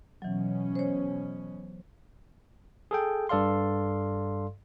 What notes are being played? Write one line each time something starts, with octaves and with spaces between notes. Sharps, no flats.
B2 E3 F#3 C#4
C5 C#5
G#4 A4 G5
G2 A4 D5 F5 C6